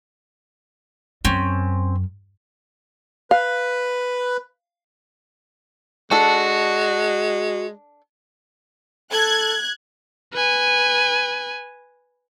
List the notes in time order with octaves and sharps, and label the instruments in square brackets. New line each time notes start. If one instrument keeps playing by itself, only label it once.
[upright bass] F#2 [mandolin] C4 C#4
[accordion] B4 [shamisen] F5
[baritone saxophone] G#3 [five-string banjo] D4 A4 [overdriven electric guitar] F#4
[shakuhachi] A4 [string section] F#6 G#6
[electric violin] B4 G#5